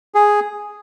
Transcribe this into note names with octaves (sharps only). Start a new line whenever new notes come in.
G#4